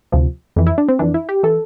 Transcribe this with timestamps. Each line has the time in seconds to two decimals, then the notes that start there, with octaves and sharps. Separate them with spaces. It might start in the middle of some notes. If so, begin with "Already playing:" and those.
0.12 D2 C3 F3
0.56 F2 E3
0.67 E4
0.78 D4
0.89 C4
0.99 F2 E3 D4
1.14 E4
1.29 G4
1.43 E3 A4